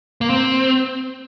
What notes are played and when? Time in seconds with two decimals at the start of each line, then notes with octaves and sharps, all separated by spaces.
0.21 A#3
0.30 C4